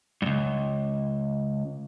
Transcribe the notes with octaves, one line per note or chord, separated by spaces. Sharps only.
C#2 G2